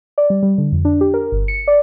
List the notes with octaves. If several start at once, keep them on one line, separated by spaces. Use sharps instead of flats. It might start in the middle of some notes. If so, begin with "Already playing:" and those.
D5
G3
G3
D3
F2
D4
G4
A#4
G1
C#7
D5